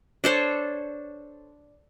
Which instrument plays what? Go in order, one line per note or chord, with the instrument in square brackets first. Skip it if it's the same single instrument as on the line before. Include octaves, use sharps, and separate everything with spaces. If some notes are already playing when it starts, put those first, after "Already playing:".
[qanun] D4 A4 C5 C#5